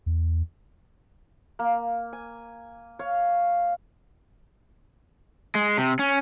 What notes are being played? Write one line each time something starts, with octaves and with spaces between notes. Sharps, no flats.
E2
A#3
G#5
C#5 F5
G#3
C3
C#4